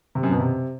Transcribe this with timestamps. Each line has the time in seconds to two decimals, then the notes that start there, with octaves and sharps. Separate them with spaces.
0.15 C3
0.23 F#2
0.31 B2
0.39 C3